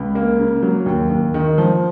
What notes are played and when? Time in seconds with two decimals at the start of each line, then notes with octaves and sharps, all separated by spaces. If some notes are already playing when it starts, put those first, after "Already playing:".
Already playing: C#2
0.15 A#3
0.38 C#3
0.63 F#3
0.86 D#2
1.10 D#2
1.34 D#3
1.58 F3